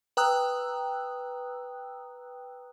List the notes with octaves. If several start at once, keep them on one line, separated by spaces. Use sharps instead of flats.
B4 G5 A#5 D#6 E6 F#6